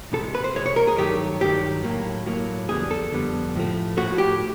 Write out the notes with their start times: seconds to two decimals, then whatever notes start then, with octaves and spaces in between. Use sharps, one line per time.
0.12 C2 C3 E3 G#3 A4
0.35 B4
0.44 C5
0.55 C2 C3 E3 G#3 C#5
0.66 C#5
0.76 A#4
0.87 G#4
0.97 G2 D#3 F#3 A3 G4
1.40 G2 D#3 F#3 A3 G4
1.83 A2 F#3 A#3
2.26 A2 F#3 A#3
2.69 F2 D3 G3 B3 G#4
2.91 A4
3.11 F2 D3 G3 B3
3.55 A2 F3 A3
3.97 A2 F3 A3 F#4
4.18 G4